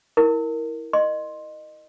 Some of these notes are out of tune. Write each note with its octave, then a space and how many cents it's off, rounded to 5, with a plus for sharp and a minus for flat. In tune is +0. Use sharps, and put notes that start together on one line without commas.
E4 -20 A#4 +0
D#5 -20 C6 +10